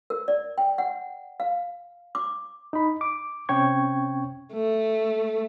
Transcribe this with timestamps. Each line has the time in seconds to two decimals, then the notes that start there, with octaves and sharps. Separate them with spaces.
0.10 A#4
0.28 D5
0.58 G5
0.78 F#5
1.40 F5
2.15 D6
2.73 D#4 B5
3.01 D6
3.49 C3 C4 C#4 G5 C#6 G#6
4.53 A3